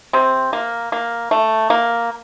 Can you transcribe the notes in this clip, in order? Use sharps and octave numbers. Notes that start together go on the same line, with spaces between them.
C3 C4
A#3
A#3
A3
A#3